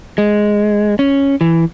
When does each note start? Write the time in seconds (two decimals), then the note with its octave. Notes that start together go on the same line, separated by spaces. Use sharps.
0.18 G#3
0.99 C#4
1.41 E3